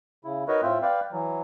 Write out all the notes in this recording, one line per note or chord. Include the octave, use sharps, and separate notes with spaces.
C#3 E4
D#4 F#4 A#4 B4 C#5 D#5
A2 C4 F4 E5 G5
B4 D5 F5 G5
E3 F#3